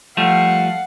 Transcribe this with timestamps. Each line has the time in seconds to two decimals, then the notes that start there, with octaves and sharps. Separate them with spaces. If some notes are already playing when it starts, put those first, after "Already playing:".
0.17 F3 G3 A3 F5 F#5